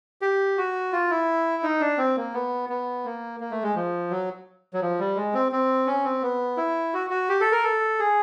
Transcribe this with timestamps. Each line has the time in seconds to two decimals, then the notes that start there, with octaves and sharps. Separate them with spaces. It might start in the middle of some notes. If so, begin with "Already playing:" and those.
0.22 G4
0.58 F#4
0.92 F4
1.11 E4
1.63 D#4
1.80 D4
1.98 C4
2.17 A#3
2.34 B3
2.69 B3
3.05 A#3
3.40 A#3
3.51 A3
3.63 G#3
3.75 F3
4.11 F#3
4.73 F#3
4.81 F3
4.99 G3
5.16 G#3
5.34 C4
5.52 C4
5.87 C#4
6.04 C4
6.22 B3
6.57 E4
6.94 F#4
7.10 F#4
7.29 G4
7.41 A4
7.52 A#4
7.63 A4
7.99 G#4